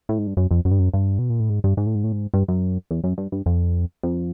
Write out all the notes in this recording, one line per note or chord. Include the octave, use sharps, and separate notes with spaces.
A2
G#2
G2
F#2
F2
F#2
G2
F#2
G2
B2
A#2
A2
G#2
G2
G#2
A2
G#2
A2
G#2
G2
F#2
E2
F#2
G2
G2
F2
F2